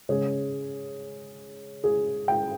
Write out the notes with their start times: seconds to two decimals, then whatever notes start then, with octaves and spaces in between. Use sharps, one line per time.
0.09 C#3 G#3 C#4 G#4
1.84 G#4
2.28 G5